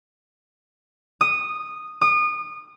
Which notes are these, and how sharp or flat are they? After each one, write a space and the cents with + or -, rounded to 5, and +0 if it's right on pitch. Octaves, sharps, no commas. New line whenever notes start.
D#6 -10
D#6 -30